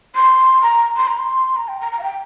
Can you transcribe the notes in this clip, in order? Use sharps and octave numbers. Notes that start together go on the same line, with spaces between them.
C6
A#5
C6
A#5
C6
A#5
G5
A#5
A#5
F5
G5